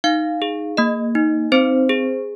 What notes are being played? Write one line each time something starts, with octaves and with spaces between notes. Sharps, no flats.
D#4 F5
G#4
A#3 D#5
D#4
C4 C5
G#4